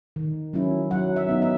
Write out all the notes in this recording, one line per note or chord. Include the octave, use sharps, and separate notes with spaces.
D#3
F#3 C#4 E4
F#3 F#5
E5
B3 D#4
E5